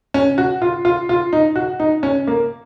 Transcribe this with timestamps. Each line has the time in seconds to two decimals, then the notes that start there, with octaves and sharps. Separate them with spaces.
0.14 C#4
0.38 F#4
0.62 F4
0.85 F4
1.09 F4
1.33 D#4
1.56 F#4
1.80 D#4
2.03 C#4
2.27 A#3